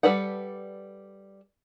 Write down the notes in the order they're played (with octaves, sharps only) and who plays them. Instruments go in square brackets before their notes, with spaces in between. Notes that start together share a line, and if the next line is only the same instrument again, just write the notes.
[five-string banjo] G3 A4 B4 D5 F#5